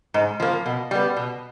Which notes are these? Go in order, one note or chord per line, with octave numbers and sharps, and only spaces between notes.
G#2
F3 A#3
B2
G3 B3
B2